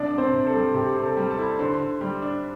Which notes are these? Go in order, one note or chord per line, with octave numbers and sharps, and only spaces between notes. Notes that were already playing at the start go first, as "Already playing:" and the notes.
Already playing: C2 D4 D5
C2
C4 C5
C3
A4
G3
C3 G4
C3
A4
G3
A4 A5
E4
D3 C5 C6
D3
G3
D4